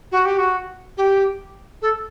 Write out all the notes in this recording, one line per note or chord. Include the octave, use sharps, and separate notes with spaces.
F#4
G4
F#4
G4
A4